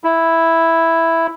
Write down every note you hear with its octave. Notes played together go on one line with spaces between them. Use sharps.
E4